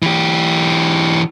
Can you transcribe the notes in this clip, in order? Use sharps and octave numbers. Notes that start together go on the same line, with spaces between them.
E3 G4